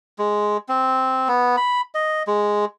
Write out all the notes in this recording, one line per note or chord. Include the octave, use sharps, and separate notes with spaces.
G#3
C4
B3
B5
D#5
G#3